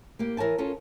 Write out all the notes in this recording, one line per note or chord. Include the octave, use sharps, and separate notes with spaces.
A#3 G4
E3 A#4 C#5 G#5 A5
C#4 F4 A4 A#4 A5